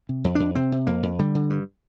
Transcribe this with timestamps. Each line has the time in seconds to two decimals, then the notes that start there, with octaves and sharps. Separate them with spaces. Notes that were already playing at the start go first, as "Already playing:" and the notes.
0.09 C3
0.24 F2
0.35 F2 D4
0.55 C3 C4
0.72 C3
0.87 F2 A#3
1.03 F2
1.19 D3 G3
1.35 D3
1.50 G2